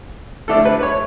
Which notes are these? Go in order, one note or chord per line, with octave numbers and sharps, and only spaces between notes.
D3 A3 D4 A4
B4
C#5